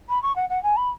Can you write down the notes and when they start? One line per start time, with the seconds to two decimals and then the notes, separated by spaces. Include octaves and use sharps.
0.09 B5
0.22 C#6
0.35 F#5
0.49 F#5
0.63 G#5
0.76 B5